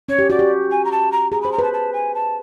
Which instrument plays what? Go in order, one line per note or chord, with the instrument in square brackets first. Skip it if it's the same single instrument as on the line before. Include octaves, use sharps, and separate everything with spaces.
[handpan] C#4 [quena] C#5
[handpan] G4
[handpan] F#4 [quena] D5
[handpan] G4
[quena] G#5
A#5
A5
A#5
[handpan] G#4 [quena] A#5
[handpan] C5 [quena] B5
[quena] A#5
[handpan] B4 [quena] A5
[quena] A5
G#5
A5